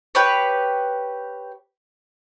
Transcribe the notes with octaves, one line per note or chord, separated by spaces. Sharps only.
G4 B4 C#5